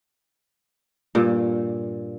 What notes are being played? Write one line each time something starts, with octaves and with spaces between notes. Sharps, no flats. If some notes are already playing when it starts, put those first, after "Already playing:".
G2 A#2